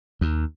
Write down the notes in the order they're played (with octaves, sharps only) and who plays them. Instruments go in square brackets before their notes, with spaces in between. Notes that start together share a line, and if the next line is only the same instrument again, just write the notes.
[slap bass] D#2